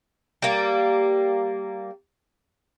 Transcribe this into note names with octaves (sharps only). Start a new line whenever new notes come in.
G3 A#3